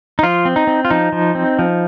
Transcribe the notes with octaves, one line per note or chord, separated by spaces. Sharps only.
D#4
F3 F4
C4
D#4
C4
F4
F3 D#4
F3
C4
F3